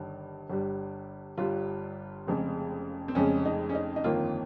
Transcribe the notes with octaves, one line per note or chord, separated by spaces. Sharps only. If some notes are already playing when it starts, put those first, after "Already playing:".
Already playing: G1 G2 D#3
G1 G2 G3
G1 G2 G3 F4
F1 F2 C#3 G#3
C4
F1 F2 C#3 G#3 C#4
D#4
C#4
D#4
D#4
G1 F2 D#3 A#3 F4